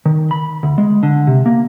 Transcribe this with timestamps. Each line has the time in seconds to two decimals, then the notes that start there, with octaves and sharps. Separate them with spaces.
0.06 D#3
0.31 B5
0.63 D2
0.78 G#3
1.03 D3
1.27 C3
1.46 A#3